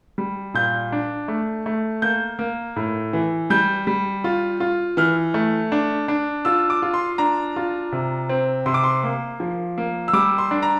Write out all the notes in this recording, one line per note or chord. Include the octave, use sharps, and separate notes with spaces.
G3
A#2 G6
D4
A3
A3
A#3 G6
A#3
A2
E3
G3 G6
G3
F4
F4
E3 F6
A3
D4
D4
F4 E6
D6
F4
C6
D4 A#5
F4
C3
C4
C3 C6
D6
C6
A#3
F3
A#3
E6
G3 D6
C6
D4
A#5